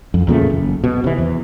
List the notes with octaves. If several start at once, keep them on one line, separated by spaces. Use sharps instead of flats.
F2
E2 A#2 C#3 A3
F#1
B2
C3 E3
E2